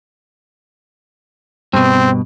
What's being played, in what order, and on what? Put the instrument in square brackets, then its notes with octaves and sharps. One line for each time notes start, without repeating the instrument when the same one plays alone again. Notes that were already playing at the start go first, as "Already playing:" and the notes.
[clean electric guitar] G2 B2 [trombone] C4